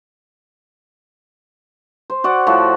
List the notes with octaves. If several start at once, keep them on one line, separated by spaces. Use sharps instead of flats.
C5
F#4 D5 F#5
A2 F3 F#4 A4